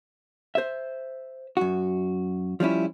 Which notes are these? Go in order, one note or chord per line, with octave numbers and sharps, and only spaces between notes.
C5 E5
F#2 F#4
F3 G3 C#4 E4